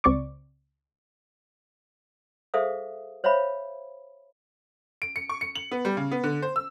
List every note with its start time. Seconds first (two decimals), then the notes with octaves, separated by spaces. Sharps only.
0.04 C#2 C4 D5 C#6 D6
2.54 G#4 A4 C5 E5 F5 D#6
3.24 C5 C#5 E5 F5 B5
5.02 D7
5.16 C#7
5.29 C#6
5.41 C#7
5.56 F#7
5.71 B3
5.85 G3
5.97 C#3
6.12 B3
6.24 D3
6.42 C5
6.56 E6